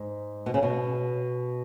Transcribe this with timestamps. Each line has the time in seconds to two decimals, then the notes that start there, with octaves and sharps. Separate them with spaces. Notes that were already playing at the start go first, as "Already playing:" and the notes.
Already playing: G#2
0.46 B2
0.54 C#3
0.63 B2